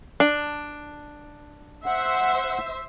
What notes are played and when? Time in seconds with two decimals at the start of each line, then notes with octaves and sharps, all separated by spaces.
0.20 D4
1.86 C5 E5 F#5